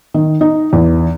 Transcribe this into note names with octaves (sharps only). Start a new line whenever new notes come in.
D#3
D#4
E2